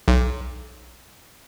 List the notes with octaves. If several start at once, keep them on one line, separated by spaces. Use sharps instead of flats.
B1